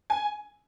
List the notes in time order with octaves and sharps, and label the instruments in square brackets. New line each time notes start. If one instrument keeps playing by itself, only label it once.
[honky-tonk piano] G#5